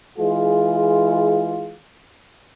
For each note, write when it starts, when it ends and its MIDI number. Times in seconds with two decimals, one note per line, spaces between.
0.19 1.76 52
0.19 1.76 56
0.19 1.76 65
0.19 1.76 68